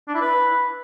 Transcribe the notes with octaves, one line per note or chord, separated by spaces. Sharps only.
D4
E4
B4